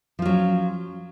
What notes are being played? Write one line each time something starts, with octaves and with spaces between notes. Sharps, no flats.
F3 F#3 C#4 F4